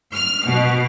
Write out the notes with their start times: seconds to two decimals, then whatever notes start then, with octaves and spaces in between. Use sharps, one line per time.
0.14 F6
0.46 B2